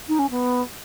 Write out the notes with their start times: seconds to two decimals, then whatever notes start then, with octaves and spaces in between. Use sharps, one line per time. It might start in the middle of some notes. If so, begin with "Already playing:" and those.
0.08 D#4
0.19 C#4
0.30 B3